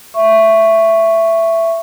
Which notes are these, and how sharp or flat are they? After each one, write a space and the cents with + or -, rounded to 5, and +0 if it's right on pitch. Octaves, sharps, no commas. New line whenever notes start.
E5 +10 C#6 +0